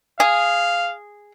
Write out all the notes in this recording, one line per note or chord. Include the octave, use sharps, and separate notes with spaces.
G#4 F5